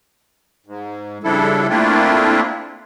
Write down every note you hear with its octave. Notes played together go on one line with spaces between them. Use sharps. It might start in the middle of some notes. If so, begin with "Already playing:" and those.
G#2
C#3 F3 G3 D4 E4 A4
A3 A#3 C4 D4 E4 F4